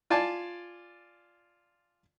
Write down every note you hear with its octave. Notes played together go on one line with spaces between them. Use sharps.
F4 D5 G#5 A5